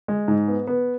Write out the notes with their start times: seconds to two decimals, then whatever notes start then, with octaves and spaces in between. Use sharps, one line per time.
0.08 G#3
0.28 G#2
0.48 B3
0.67 B3